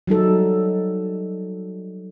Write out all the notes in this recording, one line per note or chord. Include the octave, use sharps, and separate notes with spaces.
F#3 G3 D#4 A4